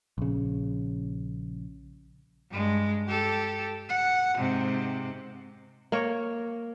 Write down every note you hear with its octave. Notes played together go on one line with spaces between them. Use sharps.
A#1 C#3
G2 G#3
G4 A4
F#5
G#2 C3
A#3 A#4 C#5